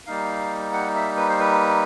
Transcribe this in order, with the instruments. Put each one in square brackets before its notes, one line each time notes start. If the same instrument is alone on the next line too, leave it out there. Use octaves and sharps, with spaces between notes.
[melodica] G3 A#3 D#4 F5
F#5
E5
B4
C5
B4